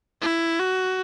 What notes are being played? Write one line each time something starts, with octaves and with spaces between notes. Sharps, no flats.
E4
F#4